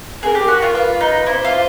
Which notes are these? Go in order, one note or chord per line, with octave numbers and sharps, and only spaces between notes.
G#4 A#4
G4
F#4
F4
F4 B4
D#4
E4 C5
F4